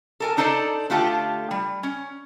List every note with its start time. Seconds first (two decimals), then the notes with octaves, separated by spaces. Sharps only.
0.20 A4 A#4 G#5
0.37 D4 D#4 A4 C5 D5
0.90 D3 A3 F4 G4 A5
1.51 G3
1.83 C#4